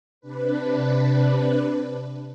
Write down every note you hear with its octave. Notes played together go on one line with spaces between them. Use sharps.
C3 D4 B4